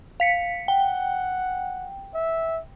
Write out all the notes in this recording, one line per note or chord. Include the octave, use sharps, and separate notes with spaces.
F5 B6 C#7
F#5 G5
E5